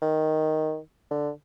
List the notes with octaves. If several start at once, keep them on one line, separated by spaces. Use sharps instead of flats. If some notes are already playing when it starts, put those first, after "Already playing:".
D#3
D3